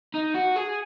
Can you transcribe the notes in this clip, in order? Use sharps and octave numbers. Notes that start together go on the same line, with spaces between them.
D#4
F#4
G#4